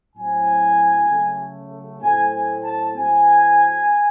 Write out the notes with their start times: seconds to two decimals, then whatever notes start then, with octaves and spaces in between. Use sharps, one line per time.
0.15 A2 F#3 C4 G#5
1.08 C#3 F#3 A3
2.02 A2 F#3 A3 C4 G#5
2.33 G#5
2.64 A5
2.96 A2 F#3 A3 C4 G#5